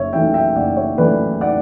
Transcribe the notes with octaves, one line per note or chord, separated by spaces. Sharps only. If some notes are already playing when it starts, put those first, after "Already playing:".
Already playing: F#1 C#5 E5
F#2 E3 A3 E5 G5
E5 G5
F#1 D5 F#5
C#5 E5
F#2 E3 A3 B4 D5
D5 F#5